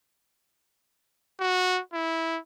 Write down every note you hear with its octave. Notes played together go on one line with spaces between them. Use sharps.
F#4
E4